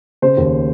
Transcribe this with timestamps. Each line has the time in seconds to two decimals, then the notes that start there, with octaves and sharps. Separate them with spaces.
0.22 C#3 C5
0.37 D#2